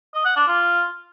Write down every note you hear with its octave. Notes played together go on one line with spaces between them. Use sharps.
D#5
F#5
D4
F4